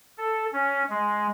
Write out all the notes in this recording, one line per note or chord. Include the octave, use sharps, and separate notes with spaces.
A4
C#4
G#3